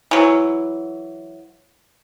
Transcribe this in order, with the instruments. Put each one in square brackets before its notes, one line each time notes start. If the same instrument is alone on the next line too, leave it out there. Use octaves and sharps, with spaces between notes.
[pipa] E3 F#3